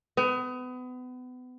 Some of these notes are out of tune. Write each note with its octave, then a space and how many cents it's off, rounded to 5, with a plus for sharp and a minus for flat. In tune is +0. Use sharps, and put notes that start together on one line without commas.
B3 +30